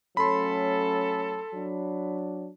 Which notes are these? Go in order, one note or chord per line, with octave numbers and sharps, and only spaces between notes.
F#3 A3 C#4 A4 B5 C6
F#3 D4